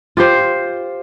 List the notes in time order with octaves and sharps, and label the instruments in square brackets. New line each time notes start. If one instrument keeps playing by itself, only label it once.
[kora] F4 G4 C5